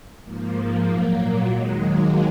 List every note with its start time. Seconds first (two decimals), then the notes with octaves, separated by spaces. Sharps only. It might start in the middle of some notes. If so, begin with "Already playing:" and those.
0.23 G#2 F3 A#3
0.85 A#2 F#3
1.46 D#2 D#3 F#3 G#3
1.77 A#3